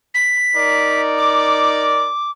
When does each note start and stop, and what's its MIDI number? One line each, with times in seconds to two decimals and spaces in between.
0.14 1.01 95
0.56 2.11 63
0.56 2.11 70
0.56 2.11 74
1.18 2.31 86